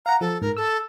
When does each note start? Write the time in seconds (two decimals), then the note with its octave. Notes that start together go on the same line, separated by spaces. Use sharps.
0.06 F5 F#5 A#5
0.21 F3 A4
0.42 G#2 A#4
0.57 A4 E6